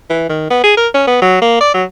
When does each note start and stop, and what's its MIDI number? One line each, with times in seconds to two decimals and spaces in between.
0.10 0.27 52
0.29 0.47 51
0.50 0.60 59
0.64 0.73 68
0.77 0.88 70
0.94 1.03 61
1.07 1.21 59
1.22 1.38 54
1.42 1.60 58
1.60 1.72 74
1.74 1.84 54